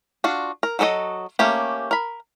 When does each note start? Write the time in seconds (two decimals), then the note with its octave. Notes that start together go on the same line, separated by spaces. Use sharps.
0.24 D4 F4 F#4
0.63 A#4
0.79 F#3 F#4 A4 A#4 D#5
1.39 A3 A#3 C#4 G4
1.91 A#4 B5